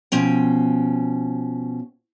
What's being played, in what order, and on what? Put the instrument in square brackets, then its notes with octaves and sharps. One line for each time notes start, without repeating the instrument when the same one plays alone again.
[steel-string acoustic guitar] B2 F3 C#4 G5